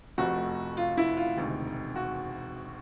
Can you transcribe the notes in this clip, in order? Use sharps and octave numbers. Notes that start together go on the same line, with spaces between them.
F1 F2 C3 F3 A3 F#4
F4
E4
F4
E1 D2 C3 D#3
F#4